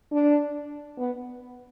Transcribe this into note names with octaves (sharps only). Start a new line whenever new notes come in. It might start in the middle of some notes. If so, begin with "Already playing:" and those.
D4
B3